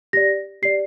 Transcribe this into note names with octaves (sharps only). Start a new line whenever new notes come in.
G4 D5 A#6
G4 D5 C7